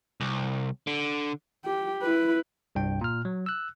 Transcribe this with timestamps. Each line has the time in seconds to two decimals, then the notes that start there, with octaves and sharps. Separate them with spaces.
0.21 C2
0.87 D3
1.66 G4
2.03 E4 B4
2.75 C2 G2 G5
3.01 A#2 F6
3.25 F#3
3.46 E6 F#6